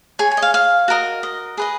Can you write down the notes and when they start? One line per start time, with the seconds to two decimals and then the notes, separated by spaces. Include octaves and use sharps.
0.19 G#4 C#5 G#5
0.32 G#5
0.37 D#5
0.42 F5
0.54 F5
0.88 F#4 A#4 D#5
1.23 D#5
1.57 G#4 B4 D#5